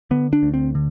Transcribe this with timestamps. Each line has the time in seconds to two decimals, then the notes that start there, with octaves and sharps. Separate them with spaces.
0.11 D3 B3
0.33 D4
0.43 D2
0.54 C4
0.75 D3